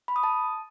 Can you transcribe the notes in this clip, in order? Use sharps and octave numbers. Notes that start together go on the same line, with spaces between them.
B5
D#6
A5